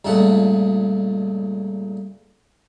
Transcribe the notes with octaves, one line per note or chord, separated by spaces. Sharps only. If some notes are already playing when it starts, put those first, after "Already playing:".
C#2 G2 A#2 A3 F#5